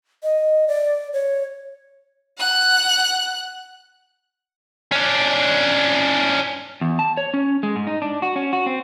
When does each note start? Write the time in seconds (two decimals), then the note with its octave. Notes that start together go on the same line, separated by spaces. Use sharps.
0.23 D#5
0.68 D5
1.13 C#5
2.38 F#5 F#6
4.92 C#4 D4
6.81 E2
6.99 A5
7.17 C#5
7.34 C#4
7.63 G#3
7.76 G#2
7.87 D#4
8.02 D4
8.22 F#4
8.36 C#4
8.53 F#4
8.66 C4